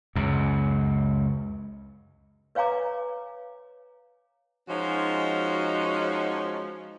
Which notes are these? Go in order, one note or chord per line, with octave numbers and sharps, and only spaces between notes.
C#2 F#2
B4 C#5 F5 G#5 A#5 D6
F3 G#3 C#4 D#4 F#4